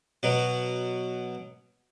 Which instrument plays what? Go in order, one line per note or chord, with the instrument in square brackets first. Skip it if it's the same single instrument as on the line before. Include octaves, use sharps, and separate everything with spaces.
[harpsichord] B2 F#3